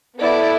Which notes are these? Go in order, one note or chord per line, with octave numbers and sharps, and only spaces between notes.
B3 E4 A4 D5